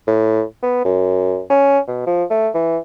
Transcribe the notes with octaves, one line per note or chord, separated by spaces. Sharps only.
A2
B3
F#2
C#4
B2
F3
A3
E3